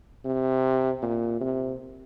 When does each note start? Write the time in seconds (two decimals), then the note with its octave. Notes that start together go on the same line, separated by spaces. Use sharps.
0.25 C3
1.02 A#2
1.41 C3